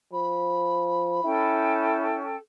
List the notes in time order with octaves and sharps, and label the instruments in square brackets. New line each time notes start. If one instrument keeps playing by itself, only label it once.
[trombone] F3 [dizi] B5
[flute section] C#4 A4 G5 [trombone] E4